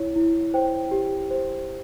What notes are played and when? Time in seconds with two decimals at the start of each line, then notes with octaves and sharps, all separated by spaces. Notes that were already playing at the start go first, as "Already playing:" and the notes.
Already playing: E4 C#5
0.16 E4
0.54 C5 G5
0.91 G4
1.30 C5